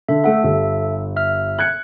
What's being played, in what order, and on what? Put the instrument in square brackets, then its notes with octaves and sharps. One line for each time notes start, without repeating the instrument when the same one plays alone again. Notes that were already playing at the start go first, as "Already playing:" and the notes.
[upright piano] D3 [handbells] E5
[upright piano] A3 F#5 [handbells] A4 E5
[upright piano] G1 G4
[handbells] E5 F6
[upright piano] F#6 G#6 C#7